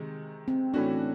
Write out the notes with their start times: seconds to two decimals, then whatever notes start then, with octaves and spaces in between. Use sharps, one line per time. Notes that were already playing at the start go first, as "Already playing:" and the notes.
Already playing: C3 D#3 G#3
0.48 C4
0.74 A2 E3 A3 C#4 D4 F#4